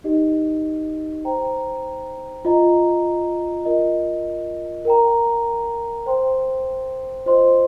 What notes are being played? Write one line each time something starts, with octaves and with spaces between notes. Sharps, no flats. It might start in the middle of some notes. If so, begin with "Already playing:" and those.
D#4 G4 D#5
C5 G5 A#5
F4 D#5 A#5
F4 A#4 D#5
A#4 G5 A#5
C5 G5 C6
F4 C5 D#5 C6